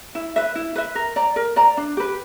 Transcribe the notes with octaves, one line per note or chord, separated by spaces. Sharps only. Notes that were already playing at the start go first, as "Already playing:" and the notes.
E4
B4 E5
E4
B4 E5
A#4
D5 A#5
A#4
D5 A#5
D4
G4 B4